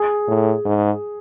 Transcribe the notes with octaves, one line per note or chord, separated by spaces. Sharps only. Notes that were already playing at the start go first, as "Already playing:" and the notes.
Already playing: G#4
A2
G#2